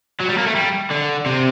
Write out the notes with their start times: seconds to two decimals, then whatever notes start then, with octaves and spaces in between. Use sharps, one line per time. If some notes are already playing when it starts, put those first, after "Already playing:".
0.20 F#3
0.28 G3
0.38 A#3
0.46 A3
0.55 G3
0.91 D3
1.26 C3